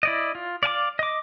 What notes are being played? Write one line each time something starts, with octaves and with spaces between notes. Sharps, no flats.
E4 D5 D#5
F4
D5 F5 G#5 D6
D#5 D6